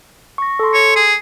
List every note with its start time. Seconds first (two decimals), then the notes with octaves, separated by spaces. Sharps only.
0.38 C#6 A#6
0.59 A4 C6
0.74 C#5
0.96 G#4